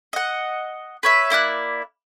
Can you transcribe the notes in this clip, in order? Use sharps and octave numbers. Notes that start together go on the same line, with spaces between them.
D#5 F#5
B4 C#5 E5
A#3 E4 D5 F#6